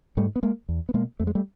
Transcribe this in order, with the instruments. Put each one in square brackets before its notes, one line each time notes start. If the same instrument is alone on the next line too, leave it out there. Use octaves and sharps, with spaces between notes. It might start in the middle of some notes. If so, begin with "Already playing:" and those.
[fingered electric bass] G#2 G3 A3
B3
G#3 A#3
E2
B3
B2 G#3 A#3
F2 A3
G#3
G3 A3